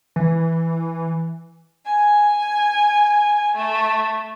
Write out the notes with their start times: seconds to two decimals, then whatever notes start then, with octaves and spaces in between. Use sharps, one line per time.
0.16 E3
1.86 G#5
3.56 A3